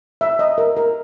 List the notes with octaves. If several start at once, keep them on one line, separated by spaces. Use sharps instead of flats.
E5
D#5
A#4
A#4